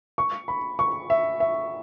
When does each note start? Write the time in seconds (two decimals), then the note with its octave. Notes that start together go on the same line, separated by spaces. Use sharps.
0.18 C#6
0.48 B5
0.79 C#6
1.10 E5
1.40 E5